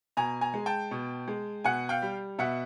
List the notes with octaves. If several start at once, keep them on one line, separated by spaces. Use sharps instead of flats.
B2 G#5 A#5
G#5 A#5
G#3
G5 A5
B2
G#3
B2 F#5 G#5
F5 G5
G3
B2 E5 F#5